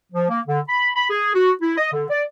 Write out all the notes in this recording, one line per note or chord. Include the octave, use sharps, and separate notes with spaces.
F3
A#3
D3
B5
B5
G#4
F#4
E4
D#5
D3
D5